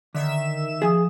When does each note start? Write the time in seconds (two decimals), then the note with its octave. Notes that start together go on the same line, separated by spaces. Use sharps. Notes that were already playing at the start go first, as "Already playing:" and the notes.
0.15 D3 D#3 E5 E7
0.82 F3 G#4 G#5 D#6